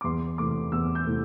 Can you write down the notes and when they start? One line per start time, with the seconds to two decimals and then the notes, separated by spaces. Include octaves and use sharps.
0.01 D6
0.04 E2 C6
0.38 C3 E3 A3 D6
0.72 E2 E6
0.95 G6
1.06 C3 E3 A3